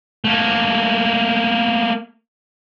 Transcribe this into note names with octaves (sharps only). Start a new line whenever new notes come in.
A3 A#3